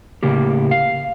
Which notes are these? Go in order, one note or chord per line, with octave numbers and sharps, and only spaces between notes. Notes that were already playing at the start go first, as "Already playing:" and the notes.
A2 C#3 A#3 G4
F5